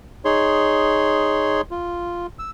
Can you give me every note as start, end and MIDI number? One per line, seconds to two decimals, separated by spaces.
0.25 1.61 63
0.25 1.61 68
0.25 1.61 73
0.25 1.61 84
1.71 2.27 65
2.39 2.51 88